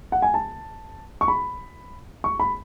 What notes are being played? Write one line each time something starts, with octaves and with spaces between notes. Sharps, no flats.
F#5
G#5
A5
C#6
B5
C#6
B5